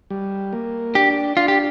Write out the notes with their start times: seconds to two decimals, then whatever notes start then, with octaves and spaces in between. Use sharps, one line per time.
0.10 G3
0.53 A#3
0.95 D4 G4
1.37 D4 F4
1.48 G4